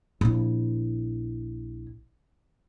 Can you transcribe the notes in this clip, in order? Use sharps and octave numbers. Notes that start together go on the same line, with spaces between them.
A#1 E4